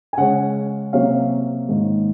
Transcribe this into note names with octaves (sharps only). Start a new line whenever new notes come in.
G#5
C#3 G#3 C#4 F#5
C3 F#3 A#3 C#4 F5
G#2 D#3 A#3